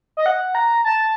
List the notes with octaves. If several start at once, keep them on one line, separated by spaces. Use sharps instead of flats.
D#5
F#5
A#5
A5